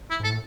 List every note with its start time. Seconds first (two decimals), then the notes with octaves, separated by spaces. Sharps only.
0.10 E4
0.20 G#2 A4
0.29 A2